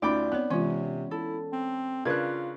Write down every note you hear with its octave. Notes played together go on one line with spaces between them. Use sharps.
D2 C#4 D#4 F4 D5 G5 B5 D6
B3 C4 C#5 F#6
C3 E3 G#3 C#4 F4
E4 A4
C4
C#3 D4 F4 A#4 B4 F#6 G#6